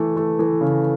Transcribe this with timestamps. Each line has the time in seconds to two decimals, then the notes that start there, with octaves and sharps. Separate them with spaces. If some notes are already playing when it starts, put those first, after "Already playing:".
Already playing: E3 A3
0.17 A3
0.39 E3
0.61 C#3